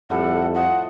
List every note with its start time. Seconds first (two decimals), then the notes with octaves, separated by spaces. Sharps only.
0.10 F2 A2 G3 A4 F#5
0.54 F3 D#5 F#5